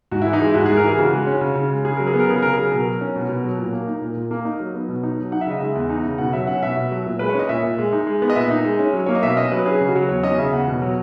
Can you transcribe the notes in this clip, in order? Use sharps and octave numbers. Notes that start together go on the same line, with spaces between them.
G#2 F#4
E3 E4
D#4
G#3 E4
G#2 F#4
G#2 G#4
A#4
E3 G#4
C#3 F#4
G#3
C#4
C#3
C#3
G#3
C#3 G#4
F#3 A#4
G#4
B3
A#4
C#3 G#4
C#3 A#4
F#3 G#4
B2 A#4
F#3
C#4
B2
B2
F#3
A#2
A#3
D#4
A#2
A#2
A#3
D#4 D#5
F#3
B3
B2
D#4
F#3
D#4 F#5
E5
C#3 D#5
G#3 E5
E2
D#4
C#3
B2 F#5
F#3 E5
C#4 F#5
B2 E5
B2
F#3
A#2
G#3 B4
C#5
C#4 D#5
A#2 E5
A#2
G#3
D#4
G#3
B3
D#5
A#2 E5
D#4
G#3
C#4
F#3
A#3 C#5
D#5
B2 E5
C#4 D#5
F#3 B4
C#4 G#4
C#3
F#4
F#3
E2 C#5
C#4 D#5
C#3 E5
E2 F#5
B2
F#3